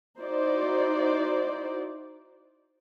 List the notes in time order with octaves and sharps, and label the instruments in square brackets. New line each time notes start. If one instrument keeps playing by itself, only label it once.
[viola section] D#4 E4 F#4 C5 D5